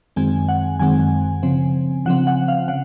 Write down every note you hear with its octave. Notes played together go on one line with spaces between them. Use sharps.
F#2 D#3 G#3 C4 G#5
F#5
F#2 D#3 G#3 C4 G#5
C#3 F3 C4
C#3 F3 C4 F#5
F#5
F5
C#3 F#5